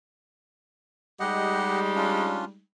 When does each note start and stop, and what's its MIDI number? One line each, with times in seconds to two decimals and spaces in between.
1.20 2.61 55
1.20 2.61 56
1.20 2.61 63
1.20 1.80 67
1.20 1.80 75
1.20 1.80 78
1.95 2.45 61
1.95 2.45 62
1.95 2.45 65